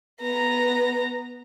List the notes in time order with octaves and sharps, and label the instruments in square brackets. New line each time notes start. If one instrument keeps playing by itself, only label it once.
[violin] B3 A#5